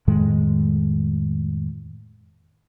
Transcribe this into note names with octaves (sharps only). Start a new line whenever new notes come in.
F2 A2 D#3 G#3